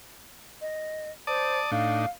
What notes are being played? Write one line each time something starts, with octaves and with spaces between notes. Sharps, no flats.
D#5
C5 D5 A5 D#6
A2 D4 D#4 F5